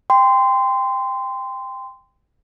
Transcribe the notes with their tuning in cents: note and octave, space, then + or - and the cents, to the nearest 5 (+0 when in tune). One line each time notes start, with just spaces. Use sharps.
G5 +20 C6 -20